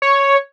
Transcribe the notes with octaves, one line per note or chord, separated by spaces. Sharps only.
C#5